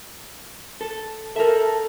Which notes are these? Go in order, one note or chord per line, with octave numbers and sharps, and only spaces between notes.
A4
A4 A#4 E5